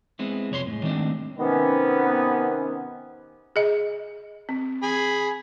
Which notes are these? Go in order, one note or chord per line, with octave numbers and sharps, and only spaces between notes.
G#3 B3 C4 E4
C2 F2 C#5 B5 C6
A2 G#3
D#3 G#3 A3 C4 D4
C3 D#3 B3 C#4
G#4 D#5
C4
G#4 B5